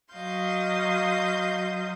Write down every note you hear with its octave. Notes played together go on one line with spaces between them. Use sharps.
F#3 D#5 F5 C6 G6